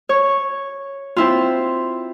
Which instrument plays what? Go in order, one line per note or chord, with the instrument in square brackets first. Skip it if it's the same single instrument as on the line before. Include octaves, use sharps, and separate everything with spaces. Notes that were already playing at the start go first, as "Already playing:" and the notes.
[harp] C#5
C4 E4 F4